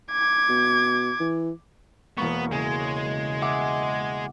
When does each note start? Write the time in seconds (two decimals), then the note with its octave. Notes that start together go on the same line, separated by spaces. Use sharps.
0.12 D6 G#6
0.49 B2
1.20 E3
2.17 E1 A#3 B3 C#6
2.51 C#3 G#3
3.42 E5 F#5 D6